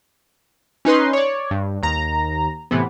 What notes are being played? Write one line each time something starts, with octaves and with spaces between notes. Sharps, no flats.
C#4 D#4 B4 C6
C#5 D5
G2
D#2 A#5
A2 C3 E3 B3